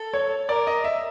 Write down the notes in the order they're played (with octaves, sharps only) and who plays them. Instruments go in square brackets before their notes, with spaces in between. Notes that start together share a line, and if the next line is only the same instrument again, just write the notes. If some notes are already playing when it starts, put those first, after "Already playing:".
Already playing: [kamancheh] A4
[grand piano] C#5
[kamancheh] A#4 [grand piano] D5
[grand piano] D#5
E5